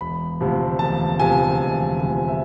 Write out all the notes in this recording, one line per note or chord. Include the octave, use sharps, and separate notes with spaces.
E1 B5
D2 C3 F3
E1 A5
D2 C3 F3 G#5
E1
D2 C3 F3
E5